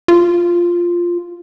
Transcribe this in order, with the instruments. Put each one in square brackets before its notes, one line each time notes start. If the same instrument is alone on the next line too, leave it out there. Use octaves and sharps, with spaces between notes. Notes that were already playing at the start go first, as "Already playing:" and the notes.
[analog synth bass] F4